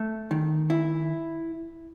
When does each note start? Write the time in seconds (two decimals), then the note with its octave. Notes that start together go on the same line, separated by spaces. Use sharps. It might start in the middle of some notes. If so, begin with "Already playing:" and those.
Already playing: A3
0.31 D#3
0.70 E4